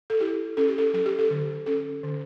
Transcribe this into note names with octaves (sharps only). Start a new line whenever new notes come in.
A4
E4 G4
C#4 A4
G4
A4
F#3 A4
G4
A4
D3
C#4 A4
D3